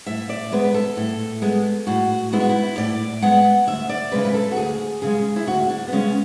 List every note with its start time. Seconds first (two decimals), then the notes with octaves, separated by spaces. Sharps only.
0.06 A2 E5
0.29 D5
0.52 G#3 B3 B4
0.64 B4
0.74 A4
0.97 A2
1.42 G#3 B3
1.87 A2 F#4
2.33 G#3 B3 E4
2.40 F#4
2.49 E4
2.78 A2 D5
3.22 G#3 B3 F#5
3.67 D2 E5
3.89 D5
4.12 C#3 G#3 B4
4.25 B4
4.34 A4
4.51 F#4
4.57 D2 G#4
5.02 C#3 G#3 G#4
5.36 E4
5.47 D2 F#4
5.70 D4
5.88 B3
5.92 C#3 G#3 C#4